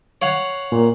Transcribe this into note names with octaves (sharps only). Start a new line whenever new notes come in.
C#5 F5 F#5
A#2